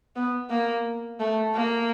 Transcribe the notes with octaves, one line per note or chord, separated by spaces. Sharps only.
B3
A#3
A3
A#3